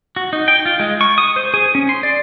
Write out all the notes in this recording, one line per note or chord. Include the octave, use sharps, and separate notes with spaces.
F#4
D#4
G5
F4
G#3
C#6
D#6
C5
G#4
C#4
C6
D5